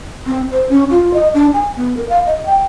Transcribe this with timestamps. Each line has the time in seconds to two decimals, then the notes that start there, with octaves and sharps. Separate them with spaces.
0.26 C4
0.51 C5
0.69 C#4
0.91 F4
1.14 D#5
1.34 D4
1.53 G#5
1.76 B3
1.97 A#4
2.09 F5
2.26 D#5
2.46 G5